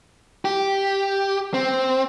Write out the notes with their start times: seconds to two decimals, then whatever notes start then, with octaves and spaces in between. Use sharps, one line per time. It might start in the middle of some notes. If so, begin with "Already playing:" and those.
0.45 G4
1.54 C4